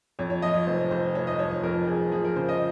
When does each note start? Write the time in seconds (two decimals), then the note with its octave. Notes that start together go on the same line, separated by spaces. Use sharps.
0.19 F2 C#5
0.30 C#5
0.42 F3 D#5
0.54 C#5
0.67 F1 C5
0.91 F2 C5
1.15 F1 C#5
1.27 D#5
1.39 F3 C#5
1.51 C#5
1.63 F2 A#4
1.87 F2 G#4
2.12 F3 G#4
2.25 A#4
2.36 C#3 C5
2.49 D#5